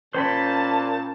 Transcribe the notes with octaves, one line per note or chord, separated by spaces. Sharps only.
A#2 C#4 C5 G5 A5 B5